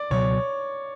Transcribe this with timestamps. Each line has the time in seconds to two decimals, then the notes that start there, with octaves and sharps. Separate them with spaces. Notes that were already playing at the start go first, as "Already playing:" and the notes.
Already playing: D5
0.10 C#2 B2 F#3 C#5